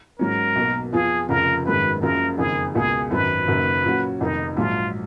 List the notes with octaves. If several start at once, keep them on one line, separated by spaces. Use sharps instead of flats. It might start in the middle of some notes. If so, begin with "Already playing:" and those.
G#2 F#3 C#4 A#4
B1 B2 A#3
F2 F3 B3 F4 G#4
F1 F2 C#3 F3 A#4
G#1 F#2 D#3 G#3 B4
F#1 F#2 C#3 F3 A#4
F#1 F2 D#3 G#4
C#2 B2 A#3 F4 G#4
G#1 F#2 D#3 F#3 B4
F#1 F#2 D#3 A#3
A#2 F#3 C#4 F#4
F1 F2 D#3 A#3 D#4
A#1 G#2 F#3 F4